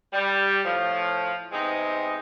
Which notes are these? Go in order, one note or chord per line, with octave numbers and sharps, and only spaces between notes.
G3
A2 F3
G#2 C3 G#3 B3 C4 D#4